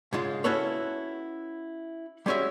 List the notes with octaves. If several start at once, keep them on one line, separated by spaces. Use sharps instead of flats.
G#2 C#3 G#3 F4
C#4 E4 F#4 A4 B4 C#5
G3 G#3 C#4 F#4 E5